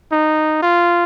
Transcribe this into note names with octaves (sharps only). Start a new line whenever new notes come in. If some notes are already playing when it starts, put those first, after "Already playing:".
D#4
F4